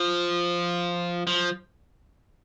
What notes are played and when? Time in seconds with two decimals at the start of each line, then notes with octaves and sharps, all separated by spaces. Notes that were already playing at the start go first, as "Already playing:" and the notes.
Already playing: F3
1.27 F3